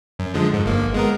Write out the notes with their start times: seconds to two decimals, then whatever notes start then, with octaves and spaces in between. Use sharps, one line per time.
0.19 F#2
0.34 D3 F3 G#3
0.54 G#2
0.66 G1 A#3
0.94 G#3 B3 A#4